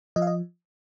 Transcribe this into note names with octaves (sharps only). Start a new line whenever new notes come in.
F3 D#5
F5
D#5